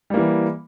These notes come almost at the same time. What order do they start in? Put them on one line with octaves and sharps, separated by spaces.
G3 A#3 E3